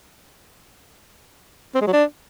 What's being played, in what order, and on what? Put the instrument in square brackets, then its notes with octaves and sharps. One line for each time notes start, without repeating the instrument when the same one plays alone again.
[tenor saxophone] C4
G#3
F#3
D4